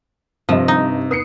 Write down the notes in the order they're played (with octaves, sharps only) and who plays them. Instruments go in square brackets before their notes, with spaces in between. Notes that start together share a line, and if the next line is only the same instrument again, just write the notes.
[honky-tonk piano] G2 G3 D#5 [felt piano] C3 [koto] F3
[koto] D#4
[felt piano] B3 [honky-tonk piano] D#6 C7 C#7